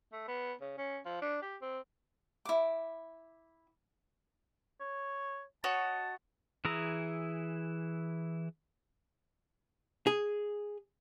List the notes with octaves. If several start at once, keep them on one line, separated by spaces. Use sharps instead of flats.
A3
B3
C#3
C#4
F3
D4
G4
C4
E4 D6
C#5
F#4 C#5 D#5 A5
E3 E4 G#4 A#5
G#4